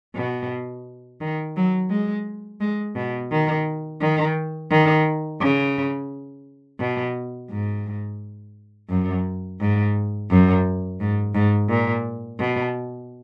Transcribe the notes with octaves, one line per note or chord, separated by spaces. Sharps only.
B2
D#3
F#3
G#3
G#3
B2
D#3
D#3
D#3
C#3
B2
G#2
F#2
G#2
F#2
G#2
G#2
A#2
B2